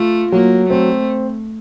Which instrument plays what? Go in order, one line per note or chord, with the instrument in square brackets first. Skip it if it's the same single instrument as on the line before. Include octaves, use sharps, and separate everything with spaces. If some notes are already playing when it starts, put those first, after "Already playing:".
Already playing: [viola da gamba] A3 [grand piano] F4
[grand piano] F#3 [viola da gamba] A#3
[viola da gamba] A3 [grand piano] C4